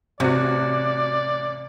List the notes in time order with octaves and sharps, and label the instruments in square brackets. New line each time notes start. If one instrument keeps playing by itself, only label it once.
[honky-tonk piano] A1 F#4 [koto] C3 [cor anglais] D5